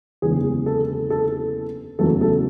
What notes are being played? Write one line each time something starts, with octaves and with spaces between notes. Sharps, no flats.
F#1 E2 D3 G#3 G#4
A4
A4
F#1 E2 C#3 F#3 A3 A4
A4